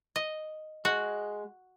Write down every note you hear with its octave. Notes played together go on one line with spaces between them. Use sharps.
D#5
G#3 F#4